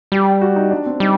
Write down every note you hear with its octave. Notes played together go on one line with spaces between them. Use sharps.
G3 G4
F#4
D#4
D4
C4
G3 D#4